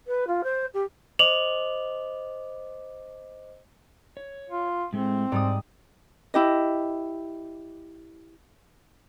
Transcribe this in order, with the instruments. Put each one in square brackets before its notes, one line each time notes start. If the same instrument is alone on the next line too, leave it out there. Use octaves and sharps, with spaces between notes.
[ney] B4
F4
C5
G4
[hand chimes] C5 D#5 D6 [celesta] F7 F#7
[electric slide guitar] C#5
[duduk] F4
[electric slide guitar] A2 G#3 A3 [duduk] C4
[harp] G#2 G3 D#6 [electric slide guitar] D5
[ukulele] E4 G4 D#5